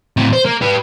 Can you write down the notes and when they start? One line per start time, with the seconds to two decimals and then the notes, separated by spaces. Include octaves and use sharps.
0.17 A2 C4
0.33 C5
0.45 A#3
0.62 G4 B4